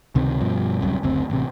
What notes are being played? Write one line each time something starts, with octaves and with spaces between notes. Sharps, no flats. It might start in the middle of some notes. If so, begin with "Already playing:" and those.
C#2 C3 D#3
G2 B2 F3
D1 C2 F#2
F#1 D2 C4
A1 C3